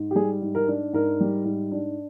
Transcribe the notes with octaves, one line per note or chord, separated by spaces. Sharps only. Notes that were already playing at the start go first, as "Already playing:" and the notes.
Already playing: G#2
G4
G3 G#4
G#2
A#4
D4
G#2 A#4
G3
G#2
D4